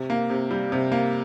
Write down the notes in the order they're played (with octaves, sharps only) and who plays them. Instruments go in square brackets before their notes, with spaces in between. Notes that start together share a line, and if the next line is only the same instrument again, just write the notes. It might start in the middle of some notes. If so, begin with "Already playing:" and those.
Already playing: [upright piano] C3
A#3
C3
G3
C3
A#3